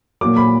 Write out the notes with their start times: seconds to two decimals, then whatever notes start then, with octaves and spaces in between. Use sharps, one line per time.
0.21 A#2 F#3 D6
0.37 B5